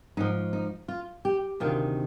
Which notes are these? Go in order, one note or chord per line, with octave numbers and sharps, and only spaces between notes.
G#2 F3 D#4
D#4
F4
G4
D2 C3 D#3 F4